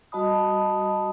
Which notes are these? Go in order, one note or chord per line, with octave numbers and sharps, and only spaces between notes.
G3 F#4 D#5 A5 B5 D#6